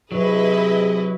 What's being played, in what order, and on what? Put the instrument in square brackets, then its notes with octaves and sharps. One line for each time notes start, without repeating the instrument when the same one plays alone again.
[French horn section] C3 G#4 [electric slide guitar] F#3 [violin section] E4 B4 D#5